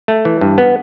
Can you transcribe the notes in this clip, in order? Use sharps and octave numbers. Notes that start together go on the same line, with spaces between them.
A3
E3
G2
B3